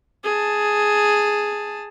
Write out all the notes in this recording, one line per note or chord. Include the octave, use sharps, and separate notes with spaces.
G#4 A5